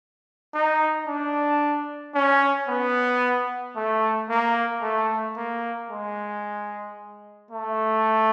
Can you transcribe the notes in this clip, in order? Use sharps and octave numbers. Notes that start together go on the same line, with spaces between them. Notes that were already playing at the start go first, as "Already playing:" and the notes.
D#4
D4
C#4
B3
A3
A#3
A3
A#3
G#3
A3